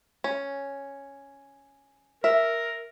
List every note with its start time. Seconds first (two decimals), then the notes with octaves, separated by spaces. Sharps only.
0.24 C#4
2.24 A#4 E5